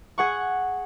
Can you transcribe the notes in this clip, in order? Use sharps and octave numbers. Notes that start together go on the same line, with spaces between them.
G#4 F#5 C#6